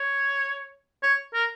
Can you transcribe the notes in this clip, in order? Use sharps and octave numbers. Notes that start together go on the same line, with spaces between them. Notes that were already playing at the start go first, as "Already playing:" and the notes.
Already playing: C#5
C#5
A#4